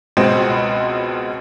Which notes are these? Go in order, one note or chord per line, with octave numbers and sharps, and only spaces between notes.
C#2 B2 G#3 C4